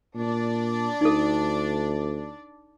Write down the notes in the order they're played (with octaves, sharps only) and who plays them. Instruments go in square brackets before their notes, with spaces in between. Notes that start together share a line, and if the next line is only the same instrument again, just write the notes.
[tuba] A#2 [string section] D4 D5
[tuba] D2 [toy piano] D#4 A4